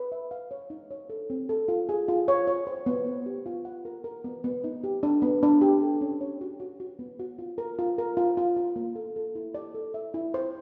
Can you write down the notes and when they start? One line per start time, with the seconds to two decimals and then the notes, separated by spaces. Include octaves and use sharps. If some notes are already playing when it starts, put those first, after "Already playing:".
Already playing: B4
0.12 E5
0.31 F5
0.51 C#5
0.70 D#4
0.91 C#5
1.10 A4
1.30 C4
1.49 A4
1.68 F4
1.89 G#4
2.09 F4
2.28 C#5
2.47 C#5
2.67 C5
2.86 B3
3.06 C5
3.26 G4
3.46 F4
3.65 F#5
3.85 A#4
4.04 A#4
4.24 B3
4.44 B3
4.64 D#4
4.84 G4
5.03 D4
5.22 B3
5.43 D4
5.61 G4
5.81 A4
6.01 C#4
6.21 C#5
6.41 F#4
6.60 F#4
6.80 F#4
6.99 B3
7.19 F#4
7.39 F4
7.58 A#4
7.79 F4
7.98 A#4
8.17 F4
8.37 F4
8.57 F4
8.76 A#3
8.95 A4
9.16 A4
9.35 E4
9.55 D5
9.74 A4
9.94 E5
10.14 E4
10.34 C5